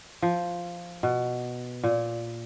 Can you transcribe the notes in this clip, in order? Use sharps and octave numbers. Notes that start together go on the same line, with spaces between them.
F3
B2
A#2